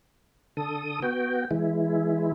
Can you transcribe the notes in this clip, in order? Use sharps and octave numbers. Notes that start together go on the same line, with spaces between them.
D3 A4 D#6
B3 F#4 G5
E3 G#3 E4